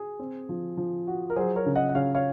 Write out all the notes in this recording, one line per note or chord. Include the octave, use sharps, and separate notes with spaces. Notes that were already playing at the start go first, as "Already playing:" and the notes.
Already playing: G#4
C4
F3
F3
F#4
A#4
F#3 G#4 C5
A#4 C#5
C#3
D#5 F#5
F#5
C#3 C#5 F5
C#5 F5